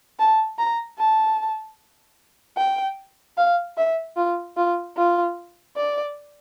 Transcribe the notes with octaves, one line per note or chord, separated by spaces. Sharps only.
A5
A#5
A5
G5
F5
E5
F4
F4
F4
D5